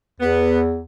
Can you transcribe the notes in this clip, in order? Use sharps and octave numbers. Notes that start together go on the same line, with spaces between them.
E2 B3